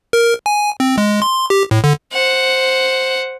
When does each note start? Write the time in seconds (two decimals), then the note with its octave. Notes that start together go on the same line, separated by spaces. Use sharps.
0.13 A#4
0.46 G#5
0.80 C4
0.98 G#3
1.22 C6
1.50 G4
1.71 A2
1.84 D3
2.13 C5 F#5